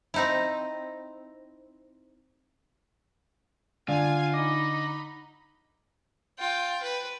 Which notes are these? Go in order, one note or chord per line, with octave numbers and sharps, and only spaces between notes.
C4 D#4 E4
D3 F4 D5 F5 G#5
D#4 D#5 B5 D6
F4 G5
B4